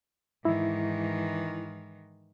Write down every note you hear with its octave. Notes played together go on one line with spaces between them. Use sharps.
G#2 D#3 E3 E4